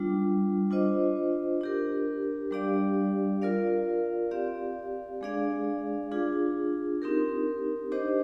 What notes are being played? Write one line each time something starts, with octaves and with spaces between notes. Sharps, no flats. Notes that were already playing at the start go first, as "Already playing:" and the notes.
Already playing: G3 D4 F4
D4 F4 C5 D#5
D4 G4 A#4
G3 D4 G4 D5 F5
F4 A#4 D5 F5
C4 G4 D5 F5
G#3 D4 G#4 D5 F5
D4 F4 G#4
C4 D#4 G4 A#4
D4 G4 C5 D#5